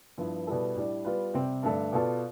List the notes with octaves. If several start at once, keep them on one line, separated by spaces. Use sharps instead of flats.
G2 F3 B3 E4
B2 G3 B3 E4 A4
A2 G3 D4
G3 B3 F4 B4
C3 G3 C4
G2 D3 A3 D4 A4
B2 B3 F4 A4 D5